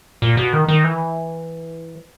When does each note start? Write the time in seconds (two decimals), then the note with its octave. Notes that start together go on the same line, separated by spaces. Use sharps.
0.22 A#2
0.37 B2
0.53 D#3
0.68 D#3
0.84 E3